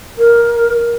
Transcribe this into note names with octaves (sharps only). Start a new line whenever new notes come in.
A#4